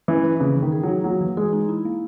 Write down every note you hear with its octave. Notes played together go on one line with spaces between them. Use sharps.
E3 C#4
B4
C#3 A#3
E3
D#3
G#4
F#3 D#4
F#3 A#3
E3
G#3 G#4
D#4
E4
A#3